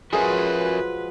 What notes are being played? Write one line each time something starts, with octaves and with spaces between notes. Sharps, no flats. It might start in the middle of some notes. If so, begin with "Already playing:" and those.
F3 F#3 G#3 F#4 G#4 A#4 B4 E5